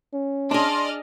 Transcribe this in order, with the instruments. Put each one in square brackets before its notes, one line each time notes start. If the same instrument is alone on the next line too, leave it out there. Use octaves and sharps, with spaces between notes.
[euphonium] C#4
[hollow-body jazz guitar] D4 G#4 [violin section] D5 D#5 F6 [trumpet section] A5 C6